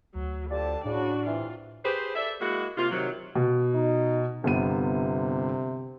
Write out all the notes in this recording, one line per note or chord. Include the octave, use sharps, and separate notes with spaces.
D2 F#3
D3 F3 G4 D5 A5
A2 C#3 D4 F#4 D5
C3 E3 F4
G4 G#4 B4 C5
A4 D5 E5
G#3 A#3 E4 F#4
C3 A#3 F4
C3 D#3 F#3
B2
D#4
G1 C3 B3 D#7